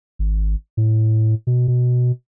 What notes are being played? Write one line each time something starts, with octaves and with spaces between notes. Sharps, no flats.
G#1
A2
B2
B2